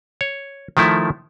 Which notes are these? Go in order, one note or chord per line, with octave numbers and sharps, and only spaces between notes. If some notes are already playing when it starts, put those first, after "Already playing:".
C#5
D#3 F3 A3 E4